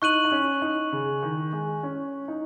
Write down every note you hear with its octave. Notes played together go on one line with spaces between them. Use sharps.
D#4 C#6 F#6 D#7 F#7
D#4
C#4
D#4
C#3
D#3
G#3
C#4
D#4